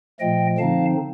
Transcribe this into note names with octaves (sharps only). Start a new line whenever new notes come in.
A#2 F3 A3 D#5 G5
D3 F3 C4 D#4 F5 A5